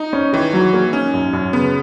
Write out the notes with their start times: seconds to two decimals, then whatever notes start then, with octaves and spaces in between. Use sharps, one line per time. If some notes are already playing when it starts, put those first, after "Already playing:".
Already playing: D#4
0.13 C#4
0.33 D#3 E3
0.53 F#3
0.73 A#3
0.93 C#4 D#4
1.14 F#2
1.33 F#2
1.53 C#3 B3